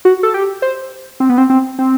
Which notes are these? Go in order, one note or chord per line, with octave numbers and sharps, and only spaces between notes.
F#4
A4
G4
C5
C4
B3
C4
C4
C4